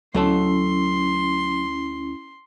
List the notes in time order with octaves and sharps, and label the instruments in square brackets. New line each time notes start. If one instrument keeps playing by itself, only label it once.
[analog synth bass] D2 [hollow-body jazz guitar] F#3 A4 A5 [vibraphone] C#4 E4 [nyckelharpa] C6